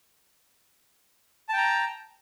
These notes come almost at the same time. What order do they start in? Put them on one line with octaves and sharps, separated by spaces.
A5 G5 A#5